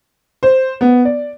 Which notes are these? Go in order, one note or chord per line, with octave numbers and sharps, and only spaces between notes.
C5
B3
D5